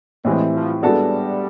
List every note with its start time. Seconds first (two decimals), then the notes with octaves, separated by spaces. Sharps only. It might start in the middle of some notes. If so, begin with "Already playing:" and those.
0.25 A2 E3 G3 G#3 C4
0.53 F3
0.83 G3 G#3 B3 D4 F#4 A4